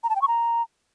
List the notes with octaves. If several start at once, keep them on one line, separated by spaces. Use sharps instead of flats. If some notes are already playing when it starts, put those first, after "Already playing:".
A#5
A5
G5
C#6
A#5